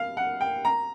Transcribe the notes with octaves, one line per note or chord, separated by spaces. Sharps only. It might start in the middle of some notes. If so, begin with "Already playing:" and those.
Already playing: F5
F#5
G5
A#5